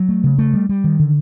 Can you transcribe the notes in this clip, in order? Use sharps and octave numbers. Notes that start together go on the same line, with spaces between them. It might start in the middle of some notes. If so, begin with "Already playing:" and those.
Already playing: F#3
A3
C#3
A3
G3
G3
D#3
D3